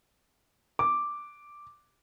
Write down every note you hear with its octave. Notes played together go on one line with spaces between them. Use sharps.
D6